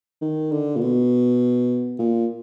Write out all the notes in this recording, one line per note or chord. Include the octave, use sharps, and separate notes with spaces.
D#3
D3
A#2
B2
A#2